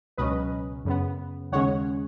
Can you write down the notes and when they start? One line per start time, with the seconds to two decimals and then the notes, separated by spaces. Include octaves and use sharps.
0.18 C#2 B2 F#3 C#4 B4 D#5
0.85 F#2 C#3 B3
1.52 D#2 C#3 G#3 C#4 C#5 F#5